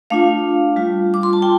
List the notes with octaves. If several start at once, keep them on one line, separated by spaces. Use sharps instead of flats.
A3 D4 F4 F5
G3 F4
D6
C6
A5
F4 G5